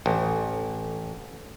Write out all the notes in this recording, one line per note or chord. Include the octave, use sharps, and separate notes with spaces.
A1